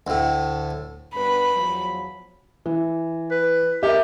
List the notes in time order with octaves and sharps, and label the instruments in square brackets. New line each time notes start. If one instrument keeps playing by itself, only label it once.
[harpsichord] D2 A2
[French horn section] G2 B3 B4 [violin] B5
[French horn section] E2 F3 F#3
[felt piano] E3
[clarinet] B4
[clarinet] G4 [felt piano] A#4 E5